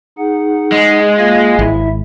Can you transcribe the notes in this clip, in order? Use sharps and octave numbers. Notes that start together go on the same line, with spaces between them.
D#4 G#4 F#5
G#3
A#3 F4 F5
G#1 E4 E5